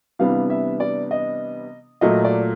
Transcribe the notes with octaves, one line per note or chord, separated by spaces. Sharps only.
C3 E3 G3 B3 D4 F5
E5
D5
D#5
A#2 F#3 A3 D#5
D5